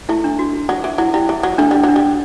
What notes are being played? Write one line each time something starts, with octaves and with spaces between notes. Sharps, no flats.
A3 E4
D4
F#4
F#3
E3
F#3 E4
G3 E4
E3
F#3
A3 D4
G3
F#3
D4
G3